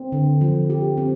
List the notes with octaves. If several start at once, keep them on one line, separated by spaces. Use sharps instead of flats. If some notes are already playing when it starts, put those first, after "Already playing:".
Already playing: C4
D3
F3
G4
C4